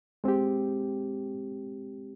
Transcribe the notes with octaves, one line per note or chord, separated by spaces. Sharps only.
G#3 C4 G4